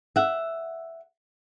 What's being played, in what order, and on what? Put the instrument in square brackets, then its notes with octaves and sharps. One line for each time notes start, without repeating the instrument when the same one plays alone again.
[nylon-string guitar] E5 F#5